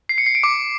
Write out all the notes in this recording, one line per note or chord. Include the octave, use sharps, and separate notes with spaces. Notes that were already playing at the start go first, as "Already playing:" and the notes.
C7
C#7
C7
D7
D6